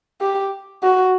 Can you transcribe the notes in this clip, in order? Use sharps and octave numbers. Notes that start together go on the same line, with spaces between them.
G4
F#4